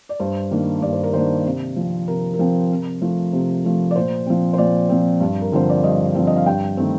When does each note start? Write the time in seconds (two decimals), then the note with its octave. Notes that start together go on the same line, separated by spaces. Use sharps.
0.09 D5
0.20 G2 C5
0.51 D#3 A#3 D4
0.82 G2 D5
0.93 C5
1.03 A#4
1.13 D#3 A#3 D4 C5
1.45 C3
1.76 F3 C4
2.08 C3 A#4
2.33 A#4
2.39 F3 C4
2.71 C3
3.02 F3 A3
3.33 C3
3.64 F3 A3
3.91 D5
3.96 A#2 C5
4.26 F3 C4
4.53 C5
4.58 A#2 D5
4.89 F3 C4
5.20 G2
5.42 A#4
5.52 D3 F3 C4 C5
5.70 D5
5.84 G2 D#5
6.15 D3 F3 C4
6.27 D#5
6.36 F5
6.46 G2 G5
6.77 D#3 A3 C4